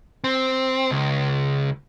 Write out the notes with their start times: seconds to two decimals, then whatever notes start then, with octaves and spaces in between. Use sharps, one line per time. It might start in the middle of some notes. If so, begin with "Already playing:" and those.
0.24 C4
0.91 C#2